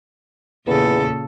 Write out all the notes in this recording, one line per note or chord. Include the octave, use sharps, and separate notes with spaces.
E2 A#2 C#3 A4